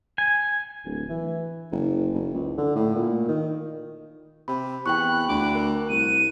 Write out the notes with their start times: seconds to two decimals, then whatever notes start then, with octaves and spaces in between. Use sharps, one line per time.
0.18 G#5
0.85 D1
1.09 E3
1.72 F#1
2.14 F#1
2.35 C#2
2.58 D3
2.75 A2
2.96 A#2
3.28 D#3
4.48 C3 B5
4.86 E2 G5 B5 C#6 F#6
5.28 D2 D6
5.55 A#4 F#6
5.89 C2 D#7